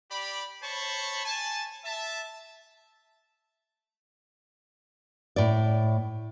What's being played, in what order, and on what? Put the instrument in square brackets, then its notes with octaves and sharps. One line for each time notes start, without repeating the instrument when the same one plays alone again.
[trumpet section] G4 D5 B5
C5 C#5 A5 B5 C#6
G#5 A5
E5 A5
[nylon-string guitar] A2 D5